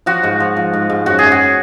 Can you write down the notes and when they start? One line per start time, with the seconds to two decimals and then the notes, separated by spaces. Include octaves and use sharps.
0.06 F3 F#4
0.23 G#2
0.40 F3
0.56 F3
0.73 G#2
0.90 G#2
1.06 F#2 F#4
1.19 F#2 G#4
1.32 F#4